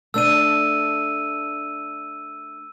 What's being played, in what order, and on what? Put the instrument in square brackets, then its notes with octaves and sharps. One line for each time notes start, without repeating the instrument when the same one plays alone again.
[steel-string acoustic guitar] A3 D4 [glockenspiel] E6 D#7